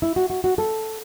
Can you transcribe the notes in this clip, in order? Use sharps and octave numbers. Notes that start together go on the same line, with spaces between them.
E4
F#4
F#4
F#4
A4